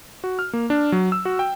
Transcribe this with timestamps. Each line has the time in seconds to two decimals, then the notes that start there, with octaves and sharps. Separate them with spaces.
0.24 F#4
0.39 F6
0.53 A#3
0.70 D4
0.92 F#3
1.12 E6
1.25 F#4
1.39 G5